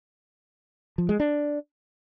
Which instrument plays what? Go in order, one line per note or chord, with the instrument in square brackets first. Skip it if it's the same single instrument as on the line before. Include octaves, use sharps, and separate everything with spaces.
[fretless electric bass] F3
G#3
D4